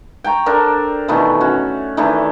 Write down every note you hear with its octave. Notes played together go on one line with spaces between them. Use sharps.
G5 A5 A#5 C#6
D4 A4 A#4 C5
B2 D#3 E3 A3
C#4 F#4
D#3 E3 A3 D4